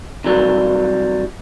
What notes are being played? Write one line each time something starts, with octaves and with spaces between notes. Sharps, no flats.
C3 E3 F#3 G3